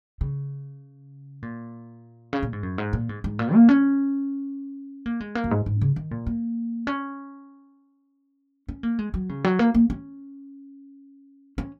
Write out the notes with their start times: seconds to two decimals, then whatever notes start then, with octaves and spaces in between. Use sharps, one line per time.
0.21 C#3
1.42 A#2
2.33 C#3
2.43 A#2
2.53 G#2
2.63 F#2
2.78 G#2
2.93 A#2
3.09 G#2
3.24 G#2
3.39 A#2
3.54 A#3
3.69 C#4
5.06 A#3
5.20 G#3
5.35 A#3
5.44 F#2
5.51 G#2
5.66 G#2
5.81 C#3
5.96 D#3
6.11 A#2
6.27 A#3
6.87 C#4
8.68 C#4
8.83 A#3
8.99 G#3
9.14 F#3
9.29 C#3
9.44 F#3
9.59 A#3
9.74 A#3
9.90 C#4
11.58 C#4